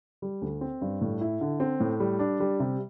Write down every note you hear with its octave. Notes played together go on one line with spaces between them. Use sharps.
G3
D2
C4
G2
A2
E4
D3
C4
A2
G3
D4
G3
C3